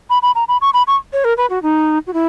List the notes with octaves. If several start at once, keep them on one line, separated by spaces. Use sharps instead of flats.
B5
B5
A#5
B5
C#6
B5
C#6
C#5
A#4
B4
F#4
D#4
F#4
E4